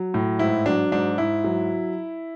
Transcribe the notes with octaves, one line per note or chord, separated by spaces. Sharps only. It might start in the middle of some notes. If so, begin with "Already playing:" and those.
Already playing: F#3
A2
G#2 E4
F#3 D4
G#2 D4
G#2 E4
F#3